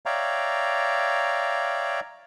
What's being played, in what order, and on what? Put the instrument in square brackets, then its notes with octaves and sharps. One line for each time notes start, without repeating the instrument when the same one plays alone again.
[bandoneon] C#5 D5 E5 F5 G5 A#5